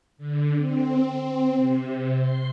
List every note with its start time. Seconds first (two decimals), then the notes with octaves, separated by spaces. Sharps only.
0.18 D3
0.57 C4
1.57 C3
2.20 C6